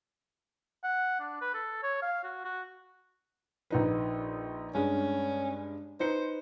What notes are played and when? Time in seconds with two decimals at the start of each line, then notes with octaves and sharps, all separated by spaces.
0.84 F#5
1.20 D4
1.41 B4
1.54 A4
1.83 C#5
2.02 F5
2.24 F#4
2.45 F#4
3.70 A#1 D#4 B4
4.74 G2 G#3 C#4
6.00 D#4 B4 C5 C#7